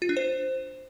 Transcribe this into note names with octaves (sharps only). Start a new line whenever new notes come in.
F4
D4
C5